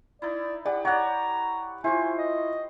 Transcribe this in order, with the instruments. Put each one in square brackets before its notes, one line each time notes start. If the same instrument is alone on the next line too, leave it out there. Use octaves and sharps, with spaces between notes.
[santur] D#4 E4 [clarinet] D5
[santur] G4 [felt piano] D5 [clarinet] F#5
[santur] C#5 D5 [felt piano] F#5 F#6 [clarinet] A#5
[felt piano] E4 F4 [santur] C5 C#6 [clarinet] G#5
[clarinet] D#5